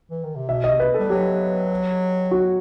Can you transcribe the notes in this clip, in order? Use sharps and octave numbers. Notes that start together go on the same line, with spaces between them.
E3
D#3
C3
B2 E5
D#5
C3
B4
A4
G3
F#3 G4
F#4